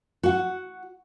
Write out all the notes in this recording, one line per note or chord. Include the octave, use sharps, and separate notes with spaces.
F#4 F#5